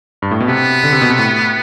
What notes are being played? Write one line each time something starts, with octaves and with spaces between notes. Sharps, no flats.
G2
A2
B2
C3 B3
D3
C3
B2
C3
A2